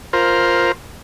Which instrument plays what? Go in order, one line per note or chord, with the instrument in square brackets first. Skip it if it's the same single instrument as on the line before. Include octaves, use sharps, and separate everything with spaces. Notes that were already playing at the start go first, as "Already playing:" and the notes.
[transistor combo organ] F4 A#4 C5